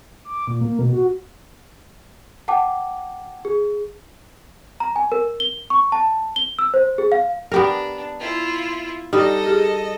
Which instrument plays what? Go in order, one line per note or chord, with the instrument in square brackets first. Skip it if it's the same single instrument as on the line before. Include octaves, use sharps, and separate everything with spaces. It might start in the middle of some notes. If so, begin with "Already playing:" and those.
[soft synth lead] D6
A#2
A#3
B2
F#4
[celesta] F#5 G5 A5 D6
G#4
A#5
G#5
A#4
G7
C#6
A5
G7
E6
C5
G#4
F5
[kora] B3 G4 A#4 [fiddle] D4
[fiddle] E4 F4
[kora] G3 D#4 [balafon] G4 [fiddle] A4 D#5
[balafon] G4 G#4